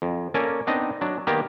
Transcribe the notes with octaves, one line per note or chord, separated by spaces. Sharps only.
F2
A#3 C#4 A4 A#4 D5 G#5
B3 C4 D4 D#4 D#5
F#3 D4
D#3 A#3 B3 G4 A#4